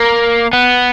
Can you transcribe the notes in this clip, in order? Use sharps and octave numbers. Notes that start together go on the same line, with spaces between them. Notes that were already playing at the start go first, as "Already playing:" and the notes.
Already playing: A#3
B3